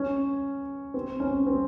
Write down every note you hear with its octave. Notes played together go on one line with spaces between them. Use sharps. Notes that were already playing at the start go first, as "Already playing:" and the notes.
Already playing: C#4
C4
C#4
C4